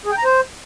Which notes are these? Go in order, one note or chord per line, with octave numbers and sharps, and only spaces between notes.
G#4
G5
A#5
C5